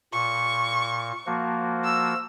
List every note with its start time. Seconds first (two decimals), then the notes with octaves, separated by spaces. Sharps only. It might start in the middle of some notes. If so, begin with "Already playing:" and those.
0.13 A#2 C#6
1.26 F3 A#3 F#4
1.85 E6